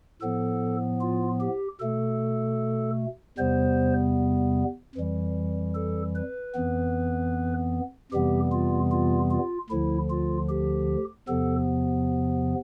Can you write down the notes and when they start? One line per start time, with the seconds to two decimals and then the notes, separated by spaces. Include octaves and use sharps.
0.21 A2 F3 B3 A4
1.01 F4
1.40 G4
1.80 B2 A3 A4
3.38 E2 C3 G3 B3 C5
4.95 F2 E3 G3
5.75 A4
6.15 B4
6.54 F2 E3 B3
8.12 F2 C3 E3 G3 B3 G4
8.52 F4
8.92 F4
9.31 F4
9.70 D2 D3 F3 E4
10.10 F4
10.49 G4
11.28 E2 C3 F3 B3 A4